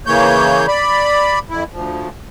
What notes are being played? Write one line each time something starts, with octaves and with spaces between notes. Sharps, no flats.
C#3 E3 A#3 C#5 G6
D5 B5
F2 E4
D2 F3